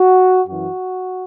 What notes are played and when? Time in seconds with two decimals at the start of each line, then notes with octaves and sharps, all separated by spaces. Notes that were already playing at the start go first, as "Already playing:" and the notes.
Already playing: F#4
0.46 F#2 E3 F#4